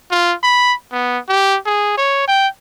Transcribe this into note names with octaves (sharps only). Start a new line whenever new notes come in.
F4
B5
B3
G4
G#4
C#5
G5